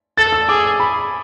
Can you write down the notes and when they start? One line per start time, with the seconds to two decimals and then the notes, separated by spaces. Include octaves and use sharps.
0.18 A4 A6
0.32 E6
0.49 G#4 D6
0.80 B5